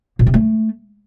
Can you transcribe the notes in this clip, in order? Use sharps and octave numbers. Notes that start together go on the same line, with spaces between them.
A#2
C3
A3